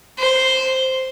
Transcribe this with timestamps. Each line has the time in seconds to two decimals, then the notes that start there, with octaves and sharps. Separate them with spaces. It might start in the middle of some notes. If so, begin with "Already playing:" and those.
0.19 C5